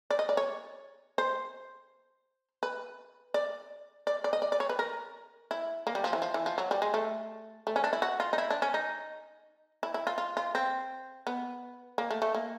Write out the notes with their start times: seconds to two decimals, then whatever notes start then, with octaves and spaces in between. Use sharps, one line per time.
0.10 D5
0.19 D#5
0.29 D5
0.37 C#5
1.18 C5
2.63 B4
3.34 D5
4.07 D5
4.24 D5
4.33 D#5
4.42 D5
4.52 D5
4.60 C#5
4.69 B4
4.79 A#4
5.51 E4
5.87 A#3
5.95 G3
6.04 F3
6.13 E3
6.22 F3
6.34 E3
6.46 F3
6.58 F#3
6.71 G3
6.82 G#3
6.94 A3
7.67 A3
7.76 C#4
7.84 D4
7.93 E4
8.02 F#4
8.20 F4
8.33 D#4
8.38 E4
8.50 D4
8.62 C#4
8.74 D#4
9.83 E4
9.94 E4
10.07 F4
10.18 F4
10.37 F4
10.55 C4
11.27 B3
11.98 A#3
12.11 A3
12.22 A3
12.35 A#3